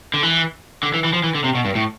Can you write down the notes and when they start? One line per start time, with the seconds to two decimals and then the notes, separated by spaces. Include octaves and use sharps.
0.14 D3
0.23 E3
0.83 D3
0.94 E3
1.04 E3
1.13 F3
1.24 E3
1.35 D3
1.44 C3
1.55 B2
1.65 G2
1.75 A2